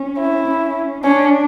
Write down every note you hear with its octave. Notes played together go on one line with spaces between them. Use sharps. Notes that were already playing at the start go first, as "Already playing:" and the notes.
Already playing: C#4
E4
C#4
C#4 D4